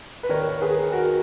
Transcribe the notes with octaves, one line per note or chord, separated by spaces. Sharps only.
B4
D#2 D#3 A#4 C#5
A#4
G#4 B4
F#4 A#4